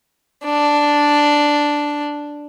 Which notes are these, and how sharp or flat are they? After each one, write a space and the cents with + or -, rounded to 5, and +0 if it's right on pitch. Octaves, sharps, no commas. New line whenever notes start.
D4 +0